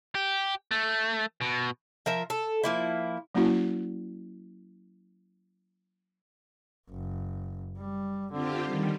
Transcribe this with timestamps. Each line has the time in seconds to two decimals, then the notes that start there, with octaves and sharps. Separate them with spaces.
0.15 G4
0.71 A3
1.41 B2
2.06 F3 A#4 E5
2.30 A4
2.64 F3 A#3 E4
3.35 F#3 A#3 C#4 E4 F#4
6.90 F#1
7.77 G3
8.32 D3 C4 F4 G4
8.64 D#3 G3